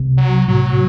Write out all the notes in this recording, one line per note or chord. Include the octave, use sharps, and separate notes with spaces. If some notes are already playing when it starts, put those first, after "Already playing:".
Already playing: C2 C3
F#3
A2 F#3